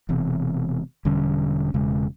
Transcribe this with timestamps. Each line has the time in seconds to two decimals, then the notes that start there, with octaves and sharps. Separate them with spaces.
0.09 E1 E2 C3
1.05 E1 D3 G3 C#4
1.74 E1 C#3 G#3